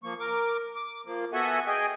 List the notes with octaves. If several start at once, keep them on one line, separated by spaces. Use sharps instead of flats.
F3 A#3 C#6
A#4 D6
D6
F3 A#3
B3 F#4 A4 E5 F#5 G#5
G#4 D#5 G5 G#5